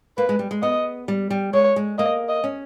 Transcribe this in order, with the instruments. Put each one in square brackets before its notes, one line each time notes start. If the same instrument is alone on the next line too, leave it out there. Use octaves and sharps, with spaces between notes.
[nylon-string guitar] A#3 [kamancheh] B4
[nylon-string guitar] G#3
G3
G#3
[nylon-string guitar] B3 [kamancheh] D#5
[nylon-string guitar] G3
G3
[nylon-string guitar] G#3 [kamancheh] C#5
[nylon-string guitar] G#3
[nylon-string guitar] A#3 [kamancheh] D#5
[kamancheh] D#5
[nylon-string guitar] C#4